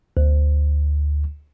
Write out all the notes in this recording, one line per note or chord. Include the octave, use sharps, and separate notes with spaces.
D2